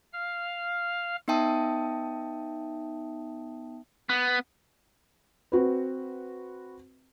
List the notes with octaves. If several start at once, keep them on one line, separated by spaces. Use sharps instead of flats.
F5 F6
B3 D#4 E5 G5 A5 D#6
B3
C4 F#4 B4